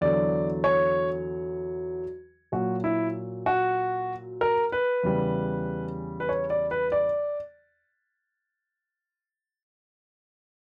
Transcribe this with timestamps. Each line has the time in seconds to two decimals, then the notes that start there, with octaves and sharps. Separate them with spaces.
0.01 E2 D3 F#3 D5
0.64 C#5
2.52 A#2 F#3 F#4
2.84 E4
3.46 F#4
4.41 A#4
4.72 B4
5.03 E2 C#3 G3
6.20 B4
6.29 C#5
6.50 D5
6.71 B4
6.92 D5